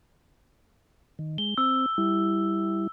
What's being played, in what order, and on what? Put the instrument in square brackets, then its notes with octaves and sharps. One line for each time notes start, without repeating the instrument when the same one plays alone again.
[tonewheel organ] D#3
[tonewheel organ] G#3 [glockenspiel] G7
[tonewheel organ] C4 [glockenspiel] E6
[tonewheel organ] G3 E4